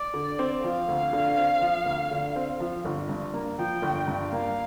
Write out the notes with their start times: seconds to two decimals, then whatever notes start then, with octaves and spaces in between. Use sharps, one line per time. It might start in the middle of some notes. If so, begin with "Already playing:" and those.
Already playing: D5
0.14 D3
0.39 C4
0.64 F3 F5
0.88 D2
1.13 D3
1.37 C4
1.61 F3
1.86 D2
2.11 D3
2.36 C4
2.60 F3
2.85 G1
3.09 G2
3.34 A#3
3.58 F3 G5
3.82 G1
4.08 G2
4.32 A#3 F5